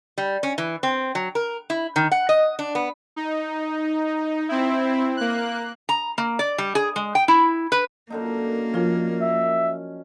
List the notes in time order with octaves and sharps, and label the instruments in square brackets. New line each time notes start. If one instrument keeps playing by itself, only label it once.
[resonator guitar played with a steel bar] G3
C#4
E3
C4
F#3
A#4
E4
D#3
F#5
D#5
D4
B3
[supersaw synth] D#4
C4 E4
A#3 F#6
[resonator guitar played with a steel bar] A#5
A#3
D5
G3
G#4
G#3
G5
E4
B4
[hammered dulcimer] F#2 D3 D#4 [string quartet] A#3
[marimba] F3 F4 [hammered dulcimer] C#4
[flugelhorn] E5